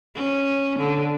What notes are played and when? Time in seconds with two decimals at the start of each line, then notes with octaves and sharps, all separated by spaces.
0.16 C#4
0.79 D3